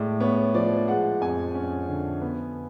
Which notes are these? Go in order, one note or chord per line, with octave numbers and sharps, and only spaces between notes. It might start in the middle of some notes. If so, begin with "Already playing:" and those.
Already playing: A2 G#3 D5
B3 C#5
F3 D5
G#3 F#5
F2 G#5
C#4
D3
B3